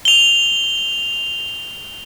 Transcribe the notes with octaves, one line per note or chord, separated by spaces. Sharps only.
F7 G7